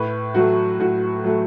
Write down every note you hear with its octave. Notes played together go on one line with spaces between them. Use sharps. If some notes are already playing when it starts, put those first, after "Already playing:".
Already playing: A2 B4
F#3 A3 F#4
A2 F#4
F#3 A3